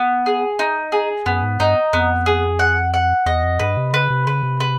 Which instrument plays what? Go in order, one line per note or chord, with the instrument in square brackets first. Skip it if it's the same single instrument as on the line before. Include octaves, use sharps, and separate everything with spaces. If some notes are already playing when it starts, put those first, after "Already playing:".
Already playing: [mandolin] B3
G#4
D#4
G#4
[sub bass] F#2 [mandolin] B3
[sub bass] G#2
[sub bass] G2 [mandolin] D#4
[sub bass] F2 [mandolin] B3
[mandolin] G#4
F#5
F#5
[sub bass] E2 [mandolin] D#5
[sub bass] F2
[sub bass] G2 [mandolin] B4
[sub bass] C3
[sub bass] C#3 [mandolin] B4
[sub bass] C3
[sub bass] C#3 [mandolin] B4
[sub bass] C3
[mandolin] B4